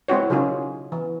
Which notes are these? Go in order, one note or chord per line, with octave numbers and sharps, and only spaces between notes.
G#3 C4 E4 F#4 C#5
C#3 F#3 C#4 D#4 F4 G#4
E3